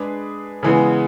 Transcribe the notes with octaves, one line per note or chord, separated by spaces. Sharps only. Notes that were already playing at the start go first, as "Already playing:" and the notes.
Already playing: G#3 D4 G#4 B4
C#3 E3 G#3 B3